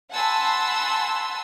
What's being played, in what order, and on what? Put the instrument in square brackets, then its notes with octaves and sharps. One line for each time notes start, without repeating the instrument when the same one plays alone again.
[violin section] F#5 G#5 A5 B5 C6 E6